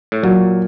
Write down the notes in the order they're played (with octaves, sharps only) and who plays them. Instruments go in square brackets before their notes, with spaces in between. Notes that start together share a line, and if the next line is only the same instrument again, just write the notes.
[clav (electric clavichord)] A2
[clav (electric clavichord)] A#2 [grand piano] F#3